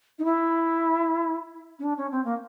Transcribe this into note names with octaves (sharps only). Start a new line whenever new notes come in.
D#4
E4
C#4
D4
C#4
C4
A#3